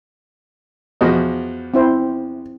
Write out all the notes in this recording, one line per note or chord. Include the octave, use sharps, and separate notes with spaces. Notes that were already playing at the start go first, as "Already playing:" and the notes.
E2 F3 F#4 D#5
C4 E4 C5